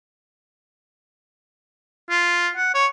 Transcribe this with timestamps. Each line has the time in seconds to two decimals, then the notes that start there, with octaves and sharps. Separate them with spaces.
2.10 F4
2.57 F#5
2.74 C#5